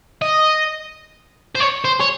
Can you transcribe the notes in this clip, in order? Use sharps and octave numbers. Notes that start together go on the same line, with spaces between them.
D#5
C5
C#5
C5
C#5